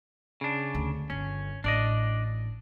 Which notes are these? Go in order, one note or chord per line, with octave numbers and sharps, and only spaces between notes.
C#3 D4
D2
G1 C#4
A1 D4 D5 D#5